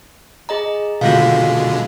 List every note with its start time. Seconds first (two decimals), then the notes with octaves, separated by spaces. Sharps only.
0.49 G#4 D#5 A#5
1.01 B2 D3 G#3 F4 F#4 F5